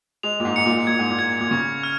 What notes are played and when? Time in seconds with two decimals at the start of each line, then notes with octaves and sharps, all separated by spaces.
0.23 G#3 F7
0.40 A#2
0.45 G#2
0.56 G#2 C#7
0.66 A#2
0.87 A#2 G#6
0.99 G#2
1.10 A#2
1.19 G#6
1.41 A#2
1.51 C#3 C#6
1.83 F6